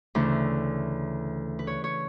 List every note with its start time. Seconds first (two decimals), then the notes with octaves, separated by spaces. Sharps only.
0.15 D2 C#3 E3
1.59 B4
1.67 C#5
1.84 C#5